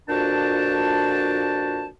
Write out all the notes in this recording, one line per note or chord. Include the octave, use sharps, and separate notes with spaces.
F2 A#2 D4 F#4 G5 A5